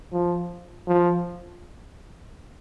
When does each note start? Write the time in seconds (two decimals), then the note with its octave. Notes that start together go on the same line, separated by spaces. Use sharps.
0.12 F3
0.88 F3